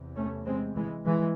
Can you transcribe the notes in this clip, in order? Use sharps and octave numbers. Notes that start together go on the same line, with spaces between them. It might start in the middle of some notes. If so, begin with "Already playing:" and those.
Already playing: E2 C3
A3 C#4
G#3 C4
E3 G#3
E3 G#3